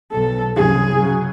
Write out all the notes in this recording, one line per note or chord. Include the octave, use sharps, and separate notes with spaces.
B1 A4
C2 F#2 C3 G#4
C#3 F#3